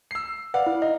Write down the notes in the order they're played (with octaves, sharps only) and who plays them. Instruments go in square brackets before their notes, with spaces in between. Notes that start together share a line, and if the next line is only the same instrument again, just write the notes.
[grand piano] E6 C7
[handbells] B4 F#5 [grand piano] D5 F5
[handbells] E4
[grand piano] D#4 [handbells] D#5